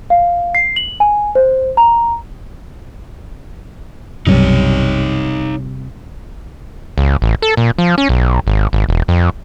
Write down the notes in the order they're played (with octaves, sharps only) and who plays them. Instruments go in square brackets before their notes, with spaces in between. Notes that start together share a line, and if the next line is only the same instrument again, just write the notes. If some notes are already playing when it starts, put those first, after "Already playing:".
[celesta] F5
C7
F#7
G#5
C5
A#5
[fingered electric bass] B1 F#2 [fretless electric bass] C3 G3 [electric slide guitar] D#4 C#5
[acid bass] C#2
A1
A4
A#2
F3
C#4
B1
G#1
G#1
E1
F2